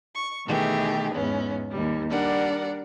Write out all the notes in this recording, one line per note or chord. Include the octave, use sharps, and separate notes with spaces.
C#6
B2 D#3 E3 A3 G4 G#4
E2 G#2 B3 C#4
D#2 G3
G3 D4 A#4 D5 F#5